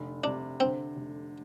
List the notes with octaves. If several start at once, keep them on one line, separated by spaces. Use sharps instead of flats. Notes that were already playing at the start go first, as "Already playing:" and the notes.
Already playing: F1 D3
C3 D4
D3 C4
F1